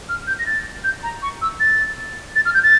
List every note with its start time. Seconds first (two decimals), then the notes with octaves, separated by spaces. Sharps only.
0.09 F6
0.27 G6
0.39 A#6
0.46 A6
0.84 G6
1.03 A#5
1.22 C#6
1.42 E6
1.60 A6
2.36 A6
2.45 F6
2.54 G6
2.63 A6